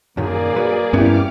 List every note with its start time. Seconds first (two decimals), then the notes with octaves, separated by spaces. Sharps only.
0.17 F#2 A#2 D#3 A#3 G#4 D5
0.56 F#3 B4
0.93 G2 B3 C#4 E4 G4 D6 F6